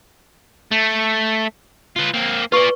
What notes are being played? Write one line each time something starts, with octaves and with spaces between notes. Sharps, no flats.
A3
F4 B4
A#3 C4
F4 B4 D5 C#6